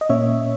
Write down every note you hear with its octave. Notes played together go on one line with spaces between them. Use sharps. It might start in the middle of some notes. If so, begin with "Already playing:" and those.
D#5
A#2 A#3 C#4 C#5 E5